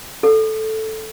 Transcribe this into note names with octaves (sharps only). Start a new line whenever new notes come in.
A4